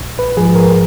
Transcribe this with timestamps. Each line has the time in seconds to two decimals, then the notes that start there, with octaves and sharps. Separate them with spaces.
0.01 A#1
0.19 B4
0.37 G#2 F3 G#4
0.55 A#4